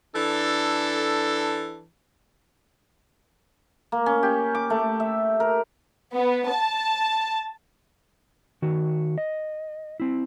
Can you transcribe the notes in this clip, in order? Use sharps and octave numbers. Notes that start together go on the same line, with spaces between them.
E3 D4 A4
A#3
C#4
G4
D6
A3
E5
A#4
B3
A5
D#3 F#4
D#5
C4 E4